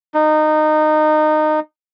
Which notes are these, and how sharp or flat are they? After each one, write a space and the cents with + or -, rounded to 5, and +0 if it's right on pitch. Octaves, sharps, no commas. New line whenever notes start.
D#4 -20